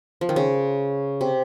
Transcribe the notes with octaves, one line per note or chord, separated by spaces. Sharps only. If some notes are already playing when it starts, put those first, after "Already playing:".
F3
D#3
C#3
C3